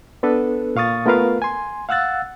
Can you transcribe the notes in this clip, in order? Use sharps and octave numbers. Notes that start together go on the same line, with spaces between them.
B3 D4 A4 B4
A#2 F5 C#6 D#6 A6
A3 B3 F4 A#4 B4 F5
G#5 C6
F5 F#5 E6 F#6 A6